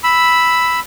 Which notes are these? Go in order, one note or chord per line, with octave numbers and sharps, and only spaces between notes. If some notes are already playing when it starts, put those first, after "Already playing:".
B5 E6